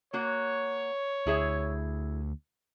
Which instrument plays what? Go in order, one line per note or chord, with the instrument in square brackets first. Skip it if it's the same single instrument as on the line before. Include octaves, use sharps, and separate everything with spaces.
[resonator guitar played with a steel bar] A#3 F#4 [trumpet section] C#5
[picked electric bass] D2 [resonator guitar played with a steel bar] E4 G#4 E5